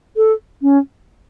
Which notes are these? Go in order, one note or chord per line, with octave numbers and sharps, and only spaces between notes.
A4
C#4